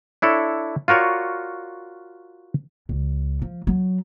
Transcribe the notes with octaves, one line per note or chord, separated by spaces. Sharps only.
D4 E4 A4 C#5
F4 F#4 A#4 C#5 D5
C#2
F3
F#3